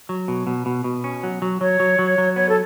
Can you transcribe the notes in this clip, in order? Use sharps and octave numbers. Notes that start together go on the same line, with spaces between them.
F#3
B2
B2
B2
B2
C#4
F#3
F#3
F#3 C#5
F#3
F#3
F#3
B3 C#5
A4